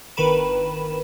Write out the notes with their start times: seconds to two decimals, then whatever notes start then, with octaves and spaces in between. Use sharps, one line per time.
0.17 G1 D#3 A#4 B4 B5 E7